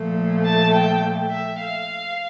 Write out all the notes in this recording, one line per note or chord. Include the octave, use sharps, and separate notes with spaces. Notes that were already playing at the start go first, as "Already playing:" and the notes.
Already playing: A#2 F3 A3
A5
G5
E5
F5